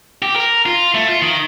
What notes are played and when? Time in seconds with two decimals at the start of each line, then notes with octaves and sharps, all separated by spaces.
0.22 G4
0.36 A#4
0.66 F4
0.94 A3
1.08 F4
1.22 D#3